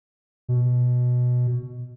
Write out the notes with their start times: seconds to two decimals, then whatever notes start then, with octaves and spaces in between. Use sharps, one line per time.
0.49 B2